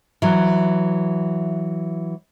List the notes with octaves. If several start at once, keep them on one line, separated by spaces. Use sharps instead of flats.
E3 F#3